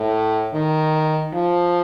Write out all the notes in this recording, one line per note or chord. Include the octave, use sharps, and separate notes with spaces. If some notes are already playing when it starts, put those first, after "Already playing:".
Already playing: A2
D#3
F3